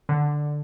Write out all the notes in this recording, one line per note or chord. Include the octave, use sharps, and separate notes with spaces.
D3